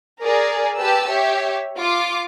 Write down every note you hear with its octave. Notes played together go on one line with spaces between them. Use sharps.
G#4 A#4 D5
G4 B4 A5 E6
G4 C#5 E5
F4 D6